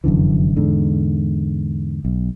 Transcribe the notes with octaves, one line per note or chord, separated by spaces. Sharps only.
F1 F#2 D3 E3
E2 G#2 D3
B1